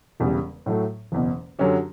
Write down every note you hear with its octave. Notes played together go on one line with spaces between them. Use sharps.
E1 E2 C#3 G3
A2 F#3 A3
F#1 E2 B2
F#2 D3 F#3 C#4 G4